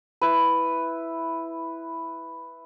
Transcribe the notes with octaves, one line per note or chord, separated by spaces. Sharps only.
E4 B4